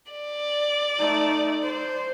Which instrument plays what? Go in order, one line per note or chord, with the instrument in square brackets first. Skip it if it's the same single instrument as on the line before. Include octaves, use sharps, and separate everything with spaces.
[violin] D5
[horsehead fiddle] A3 D#4
C5